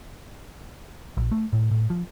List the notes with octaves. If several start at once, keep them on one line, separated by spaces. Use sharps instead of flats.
A#1
A3
A2
A2
F3